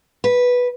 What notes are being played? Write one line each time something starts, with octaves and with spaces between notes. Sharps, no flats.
B4